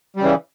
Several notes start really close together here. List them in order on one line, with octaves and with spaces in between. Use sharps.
G3 C#3 E3